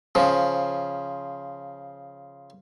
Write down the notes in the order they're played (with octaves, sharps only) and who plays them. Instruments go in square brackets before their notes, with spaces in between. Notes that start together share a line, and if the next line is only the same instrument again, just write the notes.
[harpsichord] C#3 F3